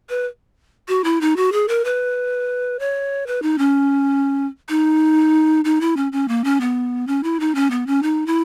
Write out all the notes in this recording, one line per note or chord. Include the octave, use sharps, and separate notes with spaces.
B4
F#4
E4
D#4
F#4
G#4
A#4
B4
C#5
B4
D#4
C#4
D#4
D#4
E4
C#4
C#4
A#3
C#4
B3
C#4
E4
D#4
C#4
B3
C#4
D#4
E4